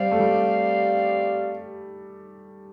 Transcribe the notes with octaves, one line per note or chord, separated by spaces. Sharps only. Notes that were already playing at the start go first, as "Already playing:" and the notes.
Already playing: G3 C4 G4 D5 F5
A3
G3